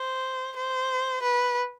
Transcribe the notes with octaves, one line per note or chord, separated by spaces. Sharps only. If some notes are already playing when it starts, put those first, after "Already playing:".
Already playing: C5
C5
B4